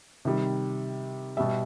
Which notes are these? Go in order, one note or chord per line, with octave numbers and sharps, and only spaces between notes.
C3 D#3 G3
B2 G3 E5